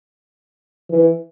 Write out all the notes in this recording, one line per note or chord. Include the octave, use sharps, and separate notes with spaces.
E3